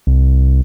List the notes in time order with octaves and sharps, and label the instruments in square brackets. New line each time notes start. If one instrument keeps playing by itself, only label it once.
[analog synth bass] C2